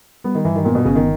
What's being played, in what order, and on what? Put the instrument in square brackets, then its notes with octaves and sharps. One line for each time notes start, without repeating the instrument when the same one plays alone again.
[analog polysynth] G3 [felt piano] B3
[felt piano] D#3
[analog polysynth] G2 [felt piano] E3
[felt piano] D#3
[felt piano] A#2 [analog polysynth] B3
[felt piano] B2
[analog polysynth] G1 [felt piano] C#3
[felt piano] D#3